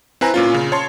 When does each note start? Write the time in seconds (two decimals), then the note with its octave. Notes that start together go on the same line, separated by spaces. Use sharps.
0.21 C4 E4 B4 G#5 A#5
0.34 A#2 C#4 F4
0.54 C#3
0.72 C#5 A5 C6